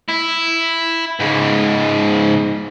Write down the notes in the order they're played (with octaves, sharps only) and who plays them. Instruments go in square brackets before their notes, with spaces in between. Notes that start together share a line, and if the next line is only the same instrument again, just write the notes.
[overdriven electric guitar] E4
G#2 C#3